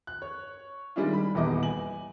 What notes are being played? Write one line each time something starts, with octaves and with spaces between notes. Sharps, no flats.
F#6
C#5
D#3 G3 G#3 D4 E4 F4
B5
D#1 E2 B3 D#5 D6
G#5 F#7